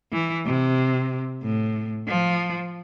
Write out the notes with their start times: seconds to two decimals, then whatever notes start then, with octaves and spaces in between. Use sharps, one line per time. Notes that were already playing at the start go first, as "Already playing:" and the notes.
0.12 E3
0.46 C3
1.42 A2
2.08 F3